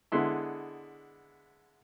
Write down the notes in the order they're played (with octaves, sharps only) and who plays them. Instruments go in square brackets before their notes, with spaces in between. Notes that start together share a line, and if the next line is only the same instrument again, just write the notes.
[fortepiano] D3 G#3 B3 E4 C6